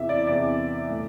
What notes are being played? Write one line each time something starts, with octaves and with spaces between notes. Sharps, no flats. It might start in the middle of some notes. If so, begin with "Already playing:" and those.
Already playing: E2 C3 E3 E5
D5
E2 C3 E3 D5
A2